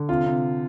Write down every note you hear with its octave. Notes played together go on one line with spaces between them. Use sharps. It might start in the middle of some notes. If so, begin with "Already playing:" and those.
Already playing: D3
C3 F4
C3